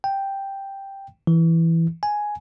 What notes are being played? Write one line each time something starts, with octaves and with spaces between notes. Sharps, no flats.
G5
E3
G#5